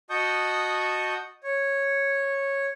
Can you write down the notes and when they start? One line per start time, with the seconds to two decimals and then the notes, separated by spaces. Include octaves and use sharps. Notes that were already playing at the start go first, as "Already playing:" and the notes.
0.10 F#4 D#5 A5 C#6 D#6 G6
1.43 C#5